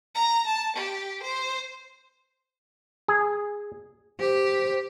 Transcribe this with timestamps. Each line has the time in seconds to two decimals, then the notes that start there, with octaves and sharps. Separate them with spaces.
0.15 A#5
0.47 A5
0.76 G4
1.23 C5
3.08 G#4
4.20 G4 C5